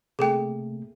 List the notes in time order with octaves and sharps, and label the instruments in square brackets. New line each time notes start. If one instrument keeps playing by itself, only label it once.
[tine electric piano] C3 A3 A#3 [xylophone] G#4 A4 G5